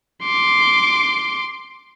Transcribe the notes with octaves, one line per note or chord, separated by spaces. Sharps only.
C6 D6